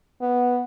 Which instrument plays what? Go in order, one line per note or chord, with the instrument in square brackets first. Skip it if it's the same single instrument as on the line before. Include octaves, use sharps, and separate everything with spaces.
[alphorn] B3